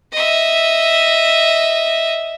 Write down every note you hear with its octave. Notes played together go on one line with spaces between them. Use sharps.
D#5 E5